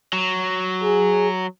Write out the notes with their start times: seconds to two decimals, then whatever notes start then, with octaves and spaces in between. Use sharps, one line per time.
0.13 F#3
0.84 G#4